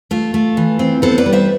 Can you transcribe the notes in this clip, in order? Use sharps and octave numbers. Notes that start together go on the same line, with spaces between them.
A3 F4
A3
E3
C4
B3 A4 C5
B4 D5
G3
C5 E5